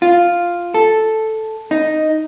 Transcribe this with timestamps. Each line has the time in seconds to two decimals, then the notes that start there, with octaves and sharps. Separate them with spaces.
0.02 F4
0.74 A4
1.71 D#4